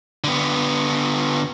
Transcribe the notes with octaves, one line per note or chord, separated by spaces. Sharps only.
D3 B3